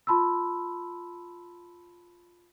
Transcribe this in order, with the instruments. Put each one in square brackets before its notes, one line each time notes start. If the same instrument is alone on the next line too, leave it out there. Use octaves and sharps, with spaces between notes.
[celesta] F4 A5 B5 C6 E6